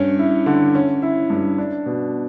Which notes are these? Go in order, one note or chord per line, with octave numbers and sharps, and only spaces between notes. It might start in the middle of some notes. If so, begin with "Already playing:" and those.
Already playing: G2 C#4
E4
D3
C#4
E4
G2
D4
B2